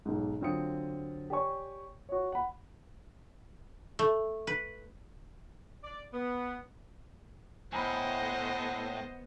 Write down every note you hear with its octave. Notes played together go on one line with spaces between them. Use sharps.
B1 G#2
D3 F#3 C4 F4 D#6 C#7
G4 C#5 D5 G#5 C#6
F#4 C#5
F#5 B5
A3
B4
D5
B3
A2 B3 C5 D#5 G#5 A#5 B5